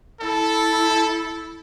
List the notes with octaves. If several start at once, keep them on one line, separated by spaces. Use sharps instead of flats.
E4 A4